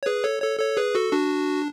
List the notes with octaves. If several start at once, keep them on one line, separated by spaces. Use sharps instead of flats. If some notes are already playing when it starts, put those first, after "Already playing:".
C#5
G#4 B4
A4 C#5
A4 C#5
A4 C#5
G#4 B4
F#4 A4
D4 F#4